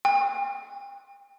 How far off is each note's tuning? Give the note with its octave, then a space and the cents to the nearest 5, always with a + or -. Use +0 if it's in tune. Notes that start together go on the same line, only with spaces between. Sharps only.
G5 +40